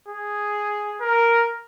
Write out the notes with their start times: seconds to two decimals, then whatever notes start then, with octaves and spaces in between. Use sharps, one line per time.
0.08 G#4
1.01 A#4